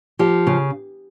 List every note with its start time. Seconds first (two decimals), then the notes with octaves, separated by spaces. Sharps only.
0.19 F3 G4
0.47 C#3